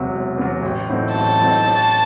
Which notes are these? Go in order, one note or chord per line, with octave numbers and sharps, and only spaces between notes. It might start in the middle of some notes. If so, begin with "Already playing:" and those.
Already playing: E1 E2 C3 F#3
E1
E2 C3 F#3
A1
A2 F#3 C4 D#4
A1 A5
A2 F#3 C4 D#4
A1